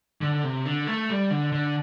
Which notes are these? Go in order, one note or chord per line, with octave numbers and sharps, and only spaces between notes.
D3
C3
D3
A3
G3
D3
D3